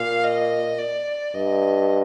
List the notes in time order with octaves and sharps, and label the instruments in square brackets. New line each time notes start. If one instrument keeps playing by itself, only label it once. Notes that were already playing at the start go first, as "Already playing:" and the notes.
Already playing: [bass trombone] A#2 [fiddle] F5
[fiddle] D#5
D5
[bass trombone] G2 [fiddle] D#5